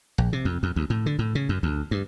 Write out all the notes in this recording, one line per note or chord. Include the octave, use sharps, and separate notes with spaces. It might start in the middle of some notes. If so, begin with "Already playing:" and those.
A#1
C3
F2
F2
D2
A2
D3
A2
C#3
F#2
D2
G2